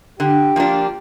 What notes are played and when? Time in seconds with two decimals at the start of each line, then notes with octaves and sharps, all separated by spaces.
0.19 D3 G4
0.56 F3 A#3 D4 F4